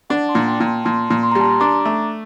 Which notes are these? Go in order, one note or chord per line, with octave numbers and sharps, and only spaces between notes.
D4 F#5 A5
A5 C6
A#2
G5 A#5
A#2
A5 C6
A#2 A5 C6
A#2
C6
G3 A#5
A5 C6
D4 A#5 D6
A3